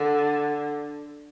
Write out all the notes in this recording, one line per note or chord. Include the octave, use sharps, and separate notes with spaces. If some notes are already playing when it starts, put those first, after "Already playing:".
Already playing: D3